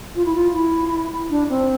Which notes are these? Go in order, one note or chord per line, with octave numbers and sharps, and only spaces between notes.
F4
E4
F4
E4
D4
C4